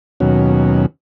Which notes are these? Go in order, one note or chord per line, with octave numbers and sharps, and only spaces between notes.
D#2 B2 F#3 C#4